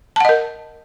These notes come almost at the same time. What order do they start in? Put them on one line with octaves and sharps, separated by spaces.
A5 F#5 D#5 A#4